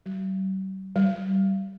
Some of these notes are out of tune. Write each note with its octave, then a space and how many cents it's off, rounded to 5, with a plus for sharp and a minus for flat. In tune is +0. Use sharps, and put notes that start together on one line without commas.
G3 -45
G3 -20